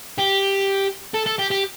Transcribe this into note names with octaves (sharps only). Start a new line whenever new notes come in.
G4
A4
A4
G4
G4